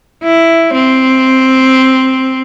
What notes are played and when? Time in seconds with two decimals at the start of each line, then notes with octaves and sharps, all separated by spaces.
0.24 E4
0.74 C4